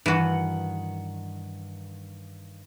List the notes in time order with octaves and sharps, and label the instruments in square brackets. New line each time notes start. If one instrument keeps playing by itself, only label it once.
[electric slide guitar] G2 D#3 F#5 [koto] E3 F#4